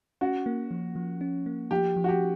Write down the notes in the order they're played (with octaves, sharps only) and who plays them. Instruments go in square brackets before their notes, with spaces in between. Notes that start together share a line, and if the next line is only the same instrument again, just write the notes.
[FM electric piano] C#4 [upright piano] F#4
[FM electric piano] A#3
F3
F3
C#4
A#3
[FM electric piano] F3 [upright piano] G4
[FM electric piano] F3
[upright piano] F#4
G4